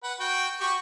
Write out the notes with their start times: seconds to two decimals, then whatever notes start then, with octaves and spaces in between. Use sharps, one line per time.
0.03 B4 F#5
0.20 F#4 G5
0.60 F#4 G4 C#6